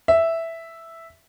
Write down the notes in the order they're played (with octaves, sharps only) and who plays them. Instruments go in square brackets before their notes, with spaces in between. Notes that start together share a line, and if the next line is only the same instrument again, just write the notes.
[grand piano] E5